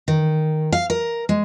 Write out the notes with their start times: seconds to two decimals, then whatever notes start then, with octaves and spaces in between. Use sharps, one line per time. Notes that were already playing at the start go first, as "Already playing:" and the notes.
0.08 D#3
0.72 F5
0.90 A#4
1.29 G#3